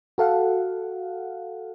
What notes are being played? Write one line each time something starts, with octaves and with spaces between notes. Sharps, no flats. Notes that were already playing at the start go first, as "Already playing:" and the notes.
F#4 A4 F5 F#5